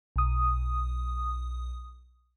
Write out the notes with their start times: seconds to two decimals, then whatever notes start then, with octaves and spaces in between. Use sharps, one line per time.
0.16 B1 D#6